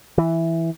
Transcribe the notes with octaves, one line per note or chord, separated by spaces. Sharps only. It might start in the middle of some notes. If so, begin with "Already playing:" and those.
E3